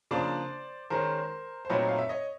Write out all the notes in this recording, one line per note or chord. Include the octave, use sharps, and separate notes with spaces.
C#3 F3 A#3 D4 C5 D5
D#3 G#3 C#4 A#4 C5
C5
A#2 F#3 A3 C4 D#4 B4 C#5
F5
E5
C#5 D#5